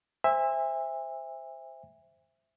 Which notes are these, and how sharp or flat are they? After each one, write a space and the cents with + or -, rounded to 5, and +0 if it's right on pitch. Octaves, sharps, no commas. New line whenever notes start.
C5 +0 E5 +0 G#5 -35